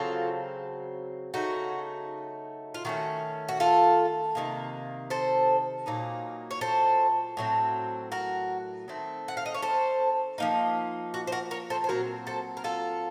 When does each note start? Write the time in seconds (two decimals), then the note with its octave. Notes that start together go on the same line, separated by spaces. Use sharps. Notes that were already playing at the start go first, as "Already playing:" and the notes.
Already playing: C#3 F#3 C4 F4 A4
1.34 C#3 F#3 A3 D#4 F#4
2.74 F4
2.85 D#3 A3 C#4 F#4
3.48 F#4
3.60 F4 A4
4.35 C3 D#3 A#3
5.10 A4 C5
5.86 A#2 F#3 A#3 D#4
6.51 C#5
6.61 A4 C5
7.37 A2 F#3 C4
8.12 F#4 A#4
8.88 D#3 A3 C4
9.28 F#5
9.37 F5
9.46 D#5
9.54 C#5
9.62 A4 C5
10.38 F3 A#3 D#4
11.14 F#4
11.27 C5
11.32 F#4 A#4
11.51 A#4 C#5
11.70 A4 C5
11.84 C5
11.89 A#2 F#3 C4 F#4 A#4
12.27 A4 C5
12.57 A#4
12.64 F4 A4